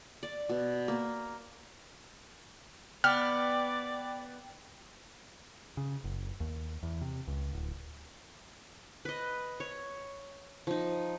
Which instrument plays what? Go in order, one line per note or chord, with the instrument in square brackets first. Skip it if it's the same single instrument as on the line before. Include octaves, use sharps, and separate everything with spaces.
[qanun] D5
B2
A#3
[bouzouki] B3 [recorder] D5 [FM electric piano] G5 [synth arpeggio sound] F6
[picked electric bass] C#3
F#1
D#2
E2
C3
C#2
D1
[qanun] B4 D#5
C#5
F3 D#4